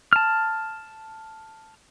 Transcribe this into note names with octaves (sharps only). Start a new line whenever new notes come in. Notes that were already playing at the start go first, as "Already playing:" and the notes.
A5 F6